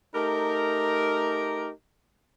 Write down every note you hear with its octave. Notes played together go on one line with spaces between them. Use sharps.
A3 D#4 G4 A#4